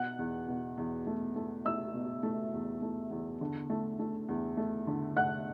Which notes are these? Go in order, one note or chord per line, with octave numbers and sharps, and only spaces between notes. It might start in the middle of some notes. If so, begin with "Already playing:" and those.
Already playing: B2 F#5 F#6
E2
B2
E2
A3
A3
A3 E5 E6
B2
A3
E2
A3
E2
D3
A3
A3
E2
A3
D3
A3 F#5 F#6